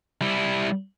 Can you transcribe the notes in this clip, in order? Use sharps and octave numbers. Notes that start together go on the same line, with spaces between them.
G3 E4